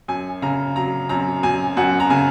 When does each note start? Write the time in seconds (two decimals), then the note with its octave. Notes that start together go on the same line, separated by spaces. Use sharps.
0.08 F#2 G#5
0.42 C#3 A#5
0.76 F#3 A#5
1.09 F#2 A#5
1.43 F#2 G#5
1.77 F#2 F#5
2.00 A#5
2.10 C#3 G#5